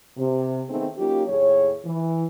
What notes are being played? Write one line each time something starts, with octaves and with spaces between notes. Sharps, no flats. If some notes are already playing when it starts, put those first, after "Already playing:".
C3
D#3 A3 B3 C4 D#4 G#4
F#3 A#3 C#4 D#4 F4 G4
D#2 A2 G#4 C#5
E3